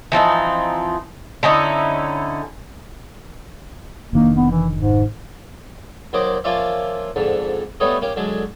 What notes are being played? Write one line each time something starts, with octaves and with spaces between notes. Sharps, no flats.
E3 F3 C4 D#4
D3 C#4 D#4 E4
F1 D#3 A#3 D4
B3
E3
G#2
D#2 F#3 A#4 C5 D#5 D6
F3 A#3 C#4 F4 D5 E5
F2 G#2 D3
G3 A3 B3 D#4 C#5 D#5
A#3 C#4 G4
D3 F#3 G#3